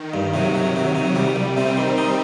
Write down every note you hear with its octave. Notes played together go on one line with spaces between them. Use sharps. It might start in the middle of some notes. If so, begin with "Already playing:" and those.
Already playing: D#3
G2
C3 F#3
C3
C3
C3
C3 G3
C2
C3 C4
D#3
D#4